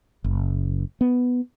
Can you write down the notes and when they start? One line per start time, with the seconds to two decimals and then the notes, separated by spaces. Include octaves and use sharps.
0.24 F#1
1.01 B3